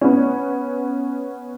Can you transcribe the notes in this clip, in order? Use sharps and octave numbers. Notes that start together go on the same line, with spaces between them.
B3 C#4